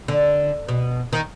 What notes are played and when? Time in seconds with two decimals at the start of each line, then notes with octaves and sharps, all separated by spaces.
0.08 D3
0.68 B2
1.13 D#3